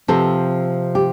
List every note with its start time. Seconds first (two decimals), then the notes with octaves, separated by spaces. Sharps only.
0.08 C3 F3 C4 A4
0.95 G4